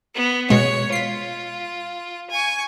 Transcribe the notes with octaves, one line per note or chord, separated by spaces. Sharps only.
B3
B2 G#3 C#5
F4 B6 C7
G#5 C#6